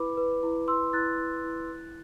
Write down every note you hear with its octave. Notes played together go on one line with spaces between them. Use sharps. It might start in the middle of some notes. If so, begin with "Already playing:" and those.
Already playing: E4 B4 B5 D6
B4
E4
E4 C6 E6
E4 F#6 A6
E4
E4
E4